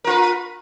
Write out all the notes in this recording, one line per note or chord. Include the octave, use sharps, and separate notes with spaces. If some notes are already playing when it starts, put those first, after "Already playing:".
F4 A#4 B4